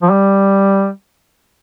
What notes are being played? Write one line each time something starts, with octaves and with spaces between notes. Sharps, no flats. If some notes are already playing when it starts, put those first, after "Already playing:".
F3
G3